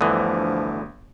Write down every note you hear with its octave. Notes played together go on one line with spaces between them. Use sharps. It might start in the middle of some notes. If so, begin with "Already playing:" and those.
G1 D2 D3 E3 F3 D#6